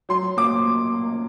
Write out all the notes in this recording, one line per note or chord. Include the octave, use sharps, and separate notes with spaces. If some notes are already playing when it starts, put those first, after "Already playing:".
F#3 C6
A#3 D6